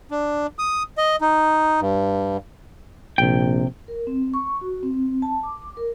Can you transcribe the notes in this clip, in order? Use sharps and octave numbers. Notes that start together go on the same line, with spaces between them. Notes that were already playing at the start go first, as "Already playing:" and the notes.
D4
D#6
D#5
D#4
G2
A#1 C3 G5
A#4
C4
C#6
F#4
C4
A5
D6
A#4